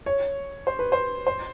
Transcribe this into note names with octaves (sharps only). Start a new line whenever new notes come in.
C#5
C5
B4
C5
C5